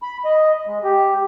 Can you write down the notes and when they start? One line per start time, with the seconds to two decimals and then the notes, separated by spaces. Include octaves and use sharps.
0.02 B5
0.25 D#5
0.67 G#3
0.84 G4